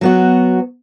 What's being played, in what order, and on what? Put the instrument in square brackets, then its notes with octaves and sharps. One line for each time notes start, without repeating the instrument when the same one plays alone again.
[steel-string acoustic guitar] F#3 B3 F#4